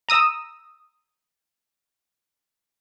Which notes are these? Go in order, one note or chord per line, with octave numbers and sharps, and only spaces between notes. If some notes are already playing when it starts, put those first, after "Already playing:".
A#5 D#6 E6